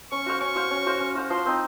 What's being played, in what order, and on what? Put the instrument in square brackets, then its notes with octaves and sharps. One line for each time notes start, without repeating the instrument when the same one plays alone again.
[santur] C#4 [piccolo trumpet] C#6
[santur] F#4 C5 F5
[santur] C#4 [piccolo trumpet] C#6
[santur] F#4 C5 F5
C#4
F#4 C5 F5
C#4
F#4 C5 F5
[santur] F3 [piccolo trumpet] C6
[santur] C4 D#4